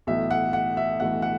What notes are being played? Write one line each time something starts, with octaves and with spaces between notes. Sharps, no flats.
B1 A2 E3 E5
F#5
F#5
E5
B1 A2 E3 F#5
F#5